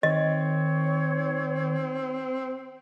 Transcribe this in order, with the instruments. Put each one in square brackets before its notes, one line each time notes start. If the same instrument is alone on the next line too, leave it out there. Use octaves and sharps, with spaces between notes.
[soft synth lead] D#3 [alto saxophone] C4 [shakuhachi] C#5 [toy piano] D#5